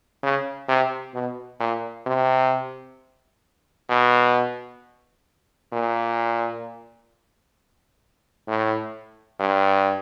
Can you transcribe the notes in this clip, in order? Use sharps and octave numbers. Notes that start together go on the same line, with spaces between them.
C#3
C3
B2
A#2
C3
B2
A#2
A2
G2